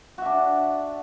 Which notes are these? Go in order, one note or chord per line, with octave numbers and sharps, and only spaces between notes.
D4 F#4 E5